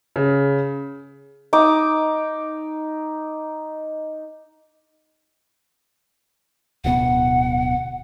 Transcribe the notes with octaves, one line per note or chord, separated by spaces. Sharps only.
C#3
D#4 D6
D1 B2 B3 F#5